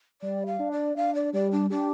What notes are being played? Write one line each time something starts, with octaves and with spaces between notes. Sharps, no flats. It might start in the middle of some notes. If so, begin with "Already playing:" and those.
G3 D5
F5
D4
D5
D4 F5
D5
G3 D5
D4
D4 G4